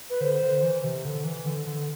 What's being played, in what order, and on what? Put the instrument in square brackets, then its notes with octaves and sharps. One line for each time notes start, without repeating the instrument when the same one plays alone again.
[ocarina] B4
[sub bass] D3 [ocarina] C5
[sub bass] D3
E3
C3
D3
E3
D3
D3